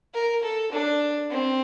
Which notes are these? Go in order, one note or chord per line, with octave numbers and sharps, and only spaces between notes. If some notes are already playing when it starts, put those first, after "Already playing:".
A#4
A4
D4
C4